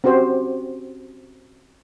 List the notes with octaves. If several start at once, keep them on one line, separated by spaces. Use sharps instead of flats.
C4 C#4 F#4 G4 C5